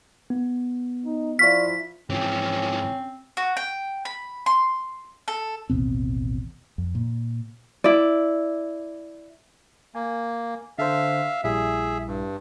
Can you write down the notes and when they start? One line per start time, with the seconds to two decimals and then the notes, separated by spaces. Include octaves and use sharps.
0.30 B3
1.06 D#4
1.39 F3 E4 F4 D5 C#6 F6 B6
2.10 G#2 E3 F3 C4 C#4
3.37 F#4
3.57 G5
4.05 B5
4.46 C6
5.28 A4
5.70 A1 D#2 B2 C4
6.78 F2
6.95 A#2
7.84 E4 D5
9.95 A#3 G#5
10.78 D3 A4 C5 E5 F5
11.44 A#1 G3 E4 G#4 E5
12.07 G2